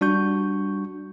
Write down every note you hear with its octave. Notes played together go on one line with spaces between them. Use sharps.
G3 D4 F#4 C#6 G6